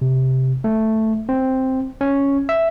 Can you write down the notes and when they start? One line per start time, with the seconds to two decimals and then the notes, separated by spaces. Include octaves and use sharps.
0.01 C3
0.64 A3
1.29 C4
2.01 C#4
2.49 E5